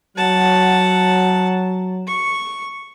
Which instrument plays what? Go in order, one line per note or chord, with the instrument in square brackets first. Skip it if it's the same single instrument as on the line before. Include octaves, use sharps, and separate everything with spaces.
[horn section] F#3 [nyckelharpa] F#5 A5
[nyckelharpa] C#6